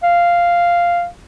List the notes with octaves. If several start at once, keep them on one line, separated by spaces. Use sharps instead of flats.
F5